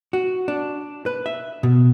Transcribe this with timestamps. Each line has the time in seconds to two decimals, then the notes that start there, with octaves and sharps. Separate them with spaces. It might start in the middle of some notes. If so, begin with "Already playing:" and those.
0.13 F#4
0.48 D4
1.06 B4
1.26 E5
1.63 B2